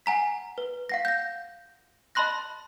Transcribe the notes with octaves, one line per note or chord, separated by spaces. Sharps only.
F#5 G#5 A#5 B6
B4
F5 F#5 A#6
G6 A#6
D#5 A5 B5 C6 F#6 A#6